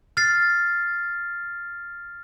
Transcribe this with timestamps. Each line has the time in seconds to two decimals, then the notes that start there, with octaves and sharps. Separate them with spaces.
0.17 F6 A6 C7